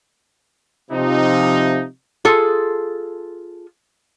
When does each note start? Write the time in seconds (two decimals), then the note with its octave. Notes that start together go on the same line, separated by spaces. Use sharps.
0.91 C3 F3 D#4
2.25 F4 G#4 A4